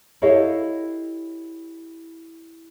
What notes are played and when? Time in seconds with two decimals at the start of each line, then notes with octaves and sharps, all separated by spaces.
0.22 E4 G4 A4 C#5 D#5 F5